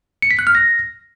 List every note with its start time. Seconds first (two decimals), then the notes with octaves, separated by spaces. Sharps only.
0.22 C#7
0.31 B6
0.39 F#6
0.47 F6
0.55 A#6